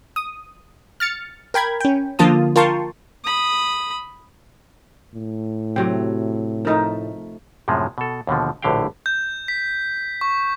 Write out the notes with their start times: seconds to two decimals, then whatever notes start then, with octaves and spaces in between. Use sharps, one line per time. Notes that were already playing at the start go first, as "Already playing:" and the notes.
0.16 D#6
1.00 F6 A6 C#7
1.54 A#4 G5 B5 G#6
1.80 C#4 G5
2.19 D3 F3 A#3 F4 A5 D#6
2.56 F4 A#4 G5 A5 C6 C#6
3.24 B5 D#6
5.14 A2
5.76 C3 F#3 G4 G5
6.65 F3 A3 D#4 A#4
7.68 F#2 A2 C3 F3 G#3
7.98 B2 A4
8.27 D#2 B2 D3 F3
8.62 A#1 A2 D3 G4 F5 G5
9.06 G6
9.48 B6
10.21 C#6